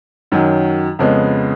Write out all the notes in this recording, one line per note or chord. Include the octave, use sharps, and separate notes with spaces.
F#2 D#3 F#3
F2 C#3 G#3 B3